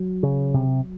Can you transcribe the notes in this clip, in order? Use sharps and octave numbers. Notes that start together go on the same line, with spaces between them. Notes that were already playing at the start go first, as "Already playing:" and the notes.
Already playing: F#3
C#3
C3